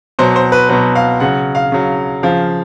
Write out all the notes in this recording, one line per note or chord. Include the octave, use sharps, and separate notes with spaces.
B2 F#3 C5
C5
B4
B2 F#3 B4
F5
C#3 F#3 F#5
F5
C#3 F#3
C#3 F3 F5